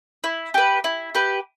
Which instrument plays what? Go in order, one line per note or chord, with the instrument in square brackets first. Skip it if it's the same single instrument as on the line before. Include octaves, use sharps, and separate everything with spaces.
[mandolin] E4
G4 B4
E4
G4 B4